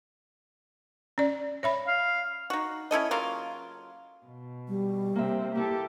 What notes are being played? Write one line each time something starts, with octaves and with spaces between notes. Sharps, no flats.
C#4 D5
C#5 E5 B5
F5
D#4 F#4
C#4 E4 A4 D#5
C#3 F#3 A#3 F4
B2
G3
C3 A#3 C4 E5
A#3 E4 G4 A4